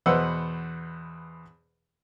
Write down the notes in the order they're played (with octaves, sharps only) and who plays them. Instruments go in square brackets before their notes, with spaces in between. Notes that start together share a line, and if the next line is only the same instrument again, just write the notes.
[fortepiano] E2 B2 B4 C5 F#5 E6